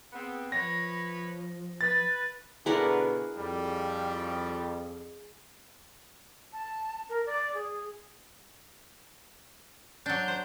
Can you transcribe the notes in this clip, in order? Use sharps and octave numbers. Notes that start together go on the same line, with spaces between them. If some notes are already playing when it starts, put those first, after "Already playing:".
B3 C4 G#4
F3 B4 C#5 B5 A#6
B4 A6
B2 D3 D4 E4 G#4 A#4 B4 F#5
F2 G3
A5
A#4
D5
G#4
F#3 D4 G6
C5